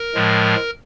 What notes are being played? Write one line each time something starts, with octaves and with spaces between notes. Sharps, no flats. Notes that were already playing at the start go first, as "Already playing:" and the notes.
Already playing: A#4
A2 F3 G#3